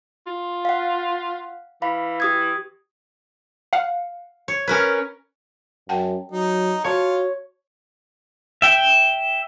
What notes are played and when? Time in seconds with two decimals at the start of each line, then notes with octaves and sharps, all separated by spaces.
0.27 F4
0.65 F5 F#5
1.82 E3 F5 B5
2.20 G4 D#6 G#6
3.73 F5 F#5
4.48 C#5
4.67 C#4 A#4 B4
5.89 F#2 F#5 G5 A5
6.32 F#3 D#4
6.84 F4 F#4 C#5 A5
8.62 E5 G5